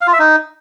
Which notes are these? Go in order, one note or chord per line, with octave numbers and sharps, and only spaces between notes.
F5
F4
E5
D#4